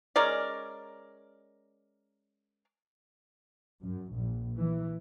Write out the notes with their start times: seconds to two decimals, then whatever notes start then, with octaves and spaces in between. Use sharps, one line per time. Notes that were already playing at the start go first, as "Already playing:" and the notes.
0.16 G#3 C#4 A#4 D5
3.83 F#2
4.13 A#1
4.56 E3